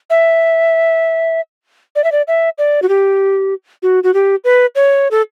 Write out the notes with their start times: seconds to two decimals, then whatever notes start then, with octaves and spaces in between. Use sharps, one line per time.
0.10 E5
1.96 D5
2.04 E5
2.12 D5
2.28 E5
2.58 D5
2.82 F#4
2.89 G4
3.83 F#4
4.04 F#4
4.14 G4
4.44 B4
4.75 C#5
5.11 A4